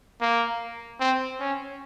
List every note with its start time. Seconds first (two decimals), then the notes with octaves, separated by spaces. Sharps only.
0.21 A#3
1.00 C4
1.40 C#4